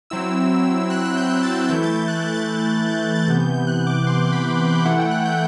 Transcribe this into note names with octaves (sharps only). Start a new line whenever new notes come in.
F#3 C4 E4 E6
F#6
F#6
G6
F#6
A6
A6
E3 A3 E4 G6
A6
G6
F#6
G6
A6
G6
G6
A6
C3 E3 B3 G6
G6
G6
F#6
D6
C6
C6
B5
E3 A3 E4 F#5
G5
F#6
G6